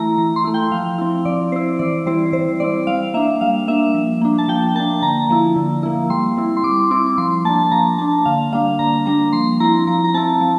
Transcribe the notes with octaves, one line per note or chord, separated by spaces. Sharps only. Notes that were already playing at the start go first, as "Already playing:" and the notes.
Already playing: E3 A3 E4 A#5
E3
C6
A3 E4
G5
F3 F5
C4 E4
F3 D5
C4 E4 C5
E3 D5
G3 C4 E4 C5
E3 C5
G3 C4 E4 D5
G3 F5
A#3 D4 E5
G3 F5
A#3 D4 E5
F3
A#3 D4
A5
F3 G5
A#3 D4 A5
D3 A#5
F3 A#3 E4
D3
F3 A#3 E4
G3 C6
C4 E4
C6
G3 D6
C4 E4 D6
F3 C6
A#3 D4 A5
F3 A#5
A#3 D4 A5
D3 F5
G3 A#3 D4 F5
D3 A#5
G3 A#3 D4 A#5
F3 C6
C4 E4 A#5
F3 A#5
A#5
C4 E4 A5
F3